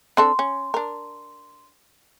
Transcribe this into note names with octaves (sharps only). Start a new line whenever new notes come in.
C4 D4 A4 C6
C#4
D4 A#4